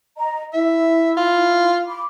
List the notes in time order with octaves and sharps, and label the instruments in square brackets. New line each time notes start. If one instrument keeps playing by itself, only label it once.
[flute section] D#5 A#5
[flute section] E4 [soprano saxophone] E5
[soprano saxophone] F4
[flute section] B5 D6